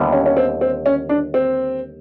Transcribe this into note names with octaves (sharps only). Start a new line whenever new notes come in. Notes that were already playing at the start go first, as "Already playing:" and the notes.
Already playing: D#2 D3 G3 B3 E4
C#4
C#4
C4
C4
C#4
D4
C4